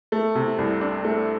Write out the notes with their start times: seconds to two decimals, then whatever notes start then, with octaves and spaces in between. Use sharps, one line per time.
0.12 A3
0.35 C3
0.58 C2
0.81 D4
1.05 A3